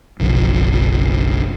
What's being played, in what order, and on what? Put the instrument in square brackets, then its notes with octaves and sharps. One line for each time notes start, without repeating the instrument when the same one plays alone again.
[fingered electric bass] F#1 B1 F3